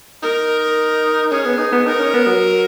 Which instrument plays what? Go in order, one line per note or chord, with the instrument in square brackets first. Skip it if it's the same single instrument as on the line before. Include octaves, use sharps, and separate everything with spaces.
[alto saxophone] D#4 [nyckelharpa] A#4
[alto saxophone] C#4 [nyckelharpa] G#4
[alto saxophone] B3
D#4
B3
[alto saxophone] D#4 [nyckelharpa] A#4
[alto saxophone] C#4
B3
F#3